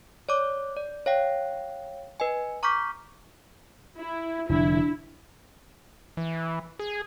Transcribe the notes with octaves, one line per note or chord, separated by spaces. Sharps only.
C#5 D5 D6
D5
C#5 F5 G5
B4 D#5 G#5
A#5 C#6 D6 F6 G6 B6
E4
F1 F2 D3 D4 E4
E3
G#4